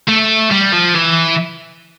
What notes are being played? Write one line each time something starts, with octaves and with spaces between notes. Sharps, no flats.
A3
G3
F3
E3